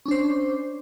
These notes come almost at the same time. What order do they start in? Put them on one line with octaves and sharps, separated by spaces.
C#4 D4 C5